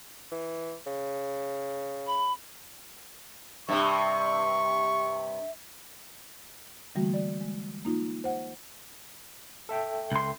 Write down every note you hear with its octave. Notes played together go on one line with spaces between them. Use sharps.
E3
C#3
B5
G2 C3 E5 C#6
D3 E3 G3 A3 A#3 F#4
D5
G#3
A#3 D#4 F4
C5 F#5
A4 E5 G5
C#2 C6